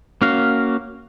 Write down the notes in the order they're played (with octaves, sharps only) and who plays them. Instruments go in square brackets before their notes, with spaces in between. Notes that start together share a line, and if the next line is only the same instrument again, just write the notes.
[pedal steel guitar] A#3 C#4 F#4 F5